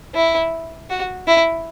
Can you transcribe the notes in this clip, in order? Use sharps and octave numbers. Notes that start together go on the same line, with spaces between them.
E4
F#4
E4